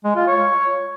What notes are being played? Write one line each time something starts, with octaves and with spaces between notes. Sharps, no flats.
G#3
F4
C#5